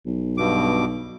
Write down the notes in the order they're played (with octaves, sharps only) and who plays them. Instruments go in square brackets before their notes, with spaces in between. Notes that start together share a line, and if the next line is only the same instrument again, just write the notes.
[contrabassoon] B1
[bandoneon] G2 B2 D6